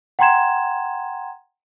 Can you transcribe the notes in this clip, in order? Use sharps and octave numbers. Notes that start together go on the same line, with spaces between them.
F#5 G5 A#5 C6 G#6 E7